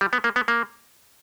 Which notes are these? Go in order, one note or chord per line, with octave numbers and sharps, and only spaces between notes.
G3
B3
A#3
B3
A#3